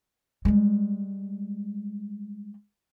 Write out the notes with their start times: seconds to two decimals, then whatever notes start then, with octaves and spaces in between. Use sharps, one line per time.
0.45 G3 G#3